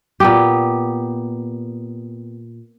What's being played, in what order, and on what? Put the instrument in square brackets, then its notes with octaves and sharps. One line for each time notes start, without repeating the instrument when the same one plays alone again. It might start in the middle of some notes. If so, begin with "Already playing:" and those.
[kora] A#2 B3 G4